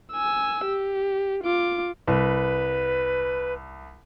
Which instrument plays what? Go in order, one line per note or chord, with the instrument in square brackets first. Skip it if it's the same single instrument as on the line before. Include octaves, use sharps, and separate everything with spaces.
[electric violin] G#5 E6
G4
F4 D6
[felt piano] C2 [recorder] B4